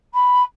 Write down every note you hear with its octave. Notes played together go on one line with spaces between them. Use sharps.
B5